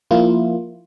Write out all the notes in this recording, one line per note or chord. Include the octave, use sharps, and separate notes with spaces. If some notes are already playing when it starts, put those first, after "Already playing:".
F3 A#3 E4 F4